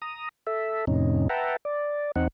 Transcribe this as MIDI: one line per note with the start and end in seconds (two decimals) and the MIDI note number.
0.02 0.29 82
0.02 0.29 87
0.47 0.85 69
0.47 0.85 76
0.87 1.28 41
0.87 1.28 45
0.87 1.28 48
0.87 1.28 61
0.87 1.28 63
1.29 1.56 71
1.29 1.56 76
1.29 1.56 78
1.29 1.56 79
1.29 1.56 81
1.29 1.56 82
1.65 2.11 74
2.16 2.28 40
2.16 2.28 60
2.16 2.28 63
2.16 2.28 78